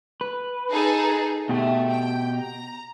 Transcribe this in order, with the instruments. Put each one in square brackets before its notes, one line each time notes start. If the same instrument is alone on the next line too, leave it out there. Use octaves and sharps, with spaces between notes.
[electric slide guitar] B4
[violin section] D#4 G#4 A4
[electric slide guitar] B2 G4 [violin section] A3
[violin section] G5
A#5